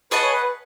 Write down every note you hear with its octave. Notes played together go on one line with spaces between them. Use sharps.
G#4 B4 D#5 F#5 A5
C#5
B4